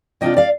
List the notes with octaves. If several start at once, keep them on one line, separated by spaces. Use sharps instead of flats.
C3 G3 D4 F4 D#5 G5
D5 F5